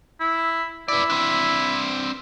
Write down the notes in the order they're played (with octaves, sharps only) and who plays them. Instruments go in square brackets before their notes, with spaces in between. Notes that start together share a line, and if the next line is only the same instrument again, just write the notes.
[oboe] E4
[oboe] E4 [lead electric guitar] B4 D5
[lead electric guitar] C4 D4